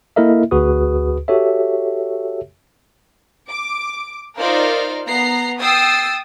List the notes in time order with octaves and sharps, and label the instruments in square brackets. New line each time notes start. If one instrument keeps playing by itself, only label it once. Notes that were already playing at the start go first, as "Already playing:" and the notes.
[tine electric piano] A#3 E4 A4 A#4 D#5 E5
D2 F#4 G#4 B4 D#6
F#4 G4 A4 C#5 E5
[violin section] D6
D#4 F4 A#4 C5 D5 F5
B3 A#5 C7
G5 D#6 E6 A6 C7